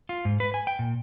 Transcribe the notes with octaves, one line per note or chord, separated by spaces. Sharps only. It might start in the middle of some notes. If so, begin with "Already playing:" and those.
F4
G#2
B4
G#5
G5
A#2